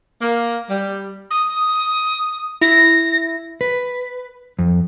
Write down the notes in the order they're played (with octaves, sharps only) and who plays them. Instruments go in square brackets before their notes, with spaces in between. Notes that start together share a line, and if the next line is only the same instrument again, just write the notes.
[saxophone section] A#3
G3
[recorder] D#6
[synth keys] E4 [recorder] A#6
[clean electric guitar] B4
F2